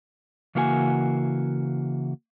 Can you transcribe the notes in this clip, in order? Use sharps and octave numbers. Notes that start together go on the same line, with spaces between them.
C#3 E3 A#3 F#4 C5 G#5